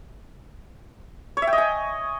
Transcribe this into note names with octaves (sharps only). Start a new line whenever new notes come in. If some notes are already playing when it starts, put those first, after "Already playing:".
C#5
E5
G5
D#5
G#5